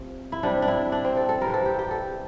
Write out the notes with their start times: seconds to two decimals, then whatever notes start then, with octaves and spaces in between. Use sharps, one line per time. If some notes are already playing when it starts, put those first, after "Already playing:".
Already playing: C3 F3
0.32 E4
0.43 C3 G3 D4
0.62 D4
0.68 E4
0.92 D4
1.05 C4
1.17 A4
1.29 A4
1.41 C3 E3 G3 A#4
1.54 A4
1.66 G4
1.79 G4
1.91 A4